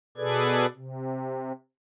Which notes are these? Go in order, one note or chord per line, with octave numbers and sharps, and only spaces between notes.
B2 G#4 A4 B4 D5 G#6
C3